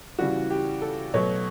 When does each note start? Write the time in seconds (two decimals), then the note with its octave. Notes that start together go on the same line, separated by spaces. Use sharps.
0.19 C#3 E3 G3 F#4
0.50 G4
0.82 A4
1.14 B2 F#3 A3 C#5